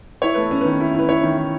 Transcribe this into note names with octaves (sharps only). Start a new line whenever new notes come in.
E4 C#5
A3 B4
C#4
D#3 B4
E4
E4 B4
E4 C#5
D#3
E4